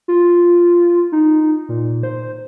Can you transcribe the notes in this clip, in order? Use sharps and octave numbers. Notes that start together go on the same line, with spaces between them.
F4
D#4
A#2
C5